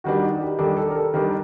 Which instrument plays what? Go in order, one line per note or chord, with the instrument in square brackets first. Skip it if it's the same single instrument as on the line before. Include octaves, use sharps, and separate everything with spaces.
[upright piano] D#3 G3 D4 [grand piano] F#4
[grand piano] D#4
G4
[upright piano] D#3 G3 D4 [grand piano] A4
[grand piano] A4
A#4
A4
[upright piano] D#3 G3 D4 [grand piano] A#4